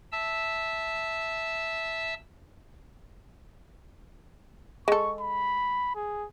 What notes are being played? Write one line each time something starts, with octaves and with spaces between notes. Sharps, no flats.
E5 A5 E6
G#3 A4 C#6
B5
G#4